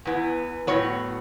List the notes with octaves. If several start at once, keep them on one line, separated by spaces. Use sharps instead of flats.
E2 E3 B3
A2 F#3 B3 C#5